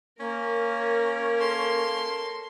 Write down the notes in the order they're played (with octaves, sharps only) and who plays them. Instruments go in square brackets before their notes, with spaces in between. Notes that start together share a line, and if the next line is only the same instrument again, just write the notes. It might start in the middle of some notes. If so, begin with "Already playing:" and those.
[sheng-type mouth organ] A#3 [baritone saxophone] C#4 [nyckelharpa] A#4
[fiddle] A4 C6